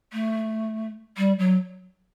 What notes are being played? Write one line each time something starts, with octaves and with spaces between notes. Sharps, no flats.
A3
G3
F#3